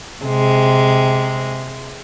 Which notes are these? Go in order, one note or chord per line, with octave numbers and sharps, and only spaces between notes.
C3 G#3